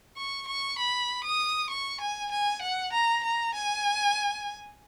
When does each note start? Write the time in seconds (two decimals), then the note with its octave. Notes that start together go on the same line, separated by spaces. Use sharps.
0.17 C#6
0.48 C#6
0.78 B5
1.24 D#6
1.70 C#6
2.01 G#5
2.31 G#5
2.62 F#5
2.93 A#5
3.24 A#5
3.54 G#5